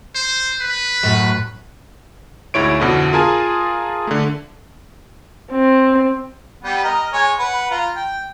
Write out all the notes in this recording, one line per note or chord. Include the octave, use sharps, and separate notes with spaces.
C5
B4
F#2 A2
D2 G#2 E4 C#5 D7
F2 B2 D3 E4
F4 G#4 A#4 G#5 A5
D3 A3
C4
G3 B3 G4
A#4 D#5
G#3 C#5 G#5
B4 F#5
F4 A#5
G5